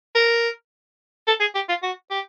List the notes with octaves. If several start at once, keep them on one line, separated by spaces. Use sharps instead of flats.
A#4
A4
G#4
G4
F4
F#4
G4